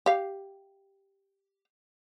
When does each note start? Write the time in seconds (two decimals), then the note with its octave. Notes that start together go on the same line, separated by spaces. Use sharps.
0.06 G4 F5